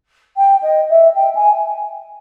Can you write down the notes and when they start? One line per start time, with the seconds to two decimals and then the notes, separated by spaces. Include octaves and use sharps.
0.37 G5
0.63 D#5
0.90 E5
1.15 G5
1.35 G#5